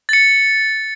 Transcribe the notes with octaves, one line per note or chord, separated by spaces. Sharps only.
A6 C#7